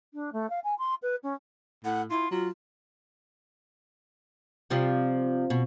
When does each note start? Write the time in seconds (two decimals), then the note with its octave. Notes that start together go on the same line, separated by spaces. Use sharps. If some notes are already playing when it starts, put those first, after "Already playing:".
0.14 D4
0.32 A3
0.50 F5
0.64 G#5
0.78 C6
1.02 B4
1.23 C#4
1.85 A2 F#5
2.10 E4 F4
2.31 F#3 F4
4.70 C3 F3 G3
5.50 B2